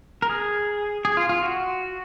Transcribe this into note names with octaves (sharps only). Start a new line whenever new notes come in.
A#4
G#4
G#4
F4
F4
F#4